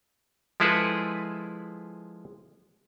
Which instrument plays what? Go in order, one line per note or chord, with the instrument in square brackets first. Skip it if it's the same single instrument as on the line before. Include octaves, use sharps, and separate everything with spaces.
[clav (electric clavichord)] F3 G#3 E4 G#4 A4 B4